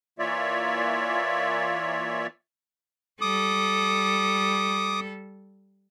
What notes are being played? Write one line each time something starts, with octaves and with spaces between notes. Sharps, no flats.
E3 A#3 F4 C#5 D5 E5
G3 A4 D6 D#6